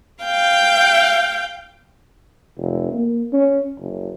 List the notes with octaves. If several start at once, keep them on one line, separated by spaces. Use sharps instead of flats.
F5 G5 G6
F1
A#3
C#4
F#1